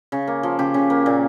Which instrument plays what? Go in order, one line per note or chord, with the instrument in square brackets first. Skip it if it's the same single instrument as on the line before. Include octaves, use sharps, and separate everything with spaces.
[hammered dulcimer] C#3
A#3
F3
C#3 G4
C#3
A#3
A#2